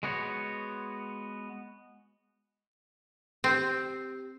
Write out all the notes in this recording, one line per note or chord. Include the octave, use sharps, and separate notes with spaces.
G#3 B3 F#4 C#5
C4 G4